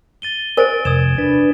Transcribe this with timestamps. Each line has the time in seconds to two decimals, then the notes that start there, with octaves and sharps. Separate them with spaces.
0.22 A6 D#7 G7
0.57 A#4 C5 G#5 A6 D7
0.85 F2 C3 D#6 G#6 E7
1.18 D4 B4 A6